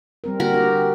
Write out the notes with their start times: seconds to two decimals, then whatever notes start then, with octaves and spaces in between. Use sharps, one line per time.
0.24 G3 C4 A#4
0.40 D3 A#3 F#4 A#4
0.54 A#3 G4